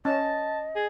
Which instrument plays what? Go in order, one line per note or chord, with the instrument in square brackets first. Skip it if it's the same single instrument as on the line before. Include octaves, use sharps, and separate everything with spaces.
[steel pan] C#4 [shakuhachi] D#5 [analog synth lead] A5
[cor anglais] G#4